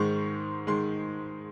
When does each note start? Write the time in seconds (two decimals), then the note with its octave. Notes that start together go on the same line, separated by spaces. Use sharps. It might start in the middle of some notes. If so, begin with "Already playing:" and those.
Already playing: G#2 D#3 G#3 C#6
0.67 D#3 G#3 C6